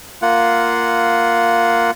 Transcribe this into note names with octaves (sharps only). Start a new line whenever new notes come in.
A#3 F4 F#5